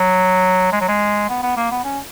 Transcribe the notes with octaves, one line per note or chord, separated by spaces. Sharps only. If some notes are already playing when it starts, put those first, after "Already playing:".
Already playing: F#3
G#3
F#3
G#3
B3
B3
A#3
B3
C#4